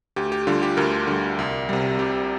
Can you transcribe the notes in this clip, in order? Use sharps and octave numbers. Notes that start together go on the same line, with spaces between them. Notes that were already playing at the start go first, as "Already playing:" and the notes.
D2 G4
G4
D3 G3 F4
G4
D2 A#4
D3 G3
C2
C3 G3
C2 G4